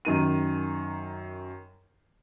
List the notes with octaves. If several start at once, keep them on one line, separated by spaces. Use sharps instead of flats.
F#2 D#3 D#7